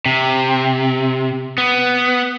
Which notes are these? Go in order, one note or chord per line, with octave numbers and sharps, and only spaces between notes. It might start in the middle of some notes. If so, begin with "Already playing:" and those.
C3
B3